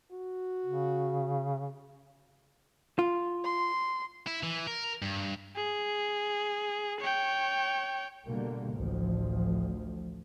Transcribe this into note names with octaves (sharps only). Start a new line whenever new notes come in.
F#4
C#3
F4
C6
E4
E3
A#4
G2
G#4
C#5 G5
B2 D3 G3 A#3
A1 D2 F3